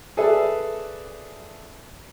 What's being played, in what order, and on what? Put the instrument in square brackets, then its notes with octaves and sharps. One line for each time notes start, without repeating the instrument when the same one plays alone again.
[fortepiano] G#4 A4 B4 D5 E5